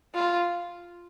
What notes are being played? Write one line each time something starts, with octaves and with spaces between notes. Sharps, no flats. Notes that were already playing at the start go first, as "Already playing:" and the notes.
F4